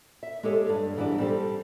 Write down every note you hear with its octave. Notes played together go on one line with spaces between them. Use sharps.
E5
G#3 G4 A4 C#5
G2
G#2 E3 G3 D4
G3 C4 A4